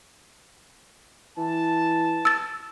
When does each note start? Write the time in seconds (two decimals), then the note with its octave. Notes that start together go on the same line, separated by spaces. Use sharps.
1.37 E3 A5
2.25 E6 A6